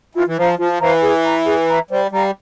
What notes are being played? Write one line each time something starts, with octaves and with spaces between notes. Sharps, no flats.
E3 F4
E3
F3 C5 F5 A#5
F3 F4
E3 C5 F5 A#5
G#4
E5 A#5
G#4
E5 A#5
G3 C5
G3 F5 A#5